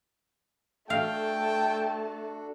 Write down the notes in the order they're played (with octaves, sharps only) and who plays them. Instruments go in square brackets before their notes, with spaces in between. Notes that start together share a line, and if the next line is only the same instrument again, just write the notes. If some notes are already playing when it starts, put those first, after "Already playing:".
[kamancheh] A3 A5 [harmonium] D4 F#4 A4 [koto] F5 [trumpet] G5